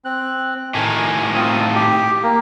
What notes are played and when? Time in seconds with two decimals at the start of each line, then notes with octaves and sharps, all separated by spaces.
0.05 C4 F#6
0.75 A2 D#3 G#5
1.35 C4 F4 D#6
1.75 G4
2.23 A#3